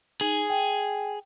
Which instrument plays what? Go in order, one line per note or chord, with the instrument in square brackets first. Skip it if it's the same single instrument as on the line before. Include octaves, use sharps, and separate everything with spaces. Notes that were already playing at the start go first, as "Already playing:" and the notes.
[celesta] D#4 G#5 F#7 [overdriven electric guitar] G#4
[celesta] G5